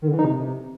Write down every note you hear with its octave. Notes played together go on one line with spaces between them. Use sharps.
D#3
D3
E3
D#4
C3